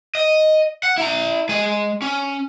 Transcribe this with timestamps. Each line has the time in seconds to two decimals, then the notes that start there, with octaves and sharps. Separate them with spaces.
0.15 D#5
0.83 F#5
0.98 E4 A#5
1.49 G#3 G#5
2.02 C#4